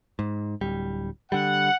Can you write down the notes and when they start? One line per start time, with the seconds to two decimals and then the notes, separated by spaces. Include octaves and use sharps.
0.19 G#2
0.61 D1 G3
1.32 D3 G3 F#5